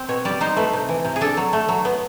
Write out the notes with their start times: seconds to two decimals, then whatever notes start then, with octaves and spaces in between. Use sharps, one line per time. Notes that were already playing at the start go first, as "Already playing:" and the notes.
Already playing: C4
0.09 B2 C#5
0.25 G3 D5
0.41 D#4 C5
0.56 A3 B4
0.73 C3
0.89 E3
1.04 C3
1.16 G#4
1.21 D4 A4
1.37 F#3
1.53 A3
1.69 F#3
1.85 B3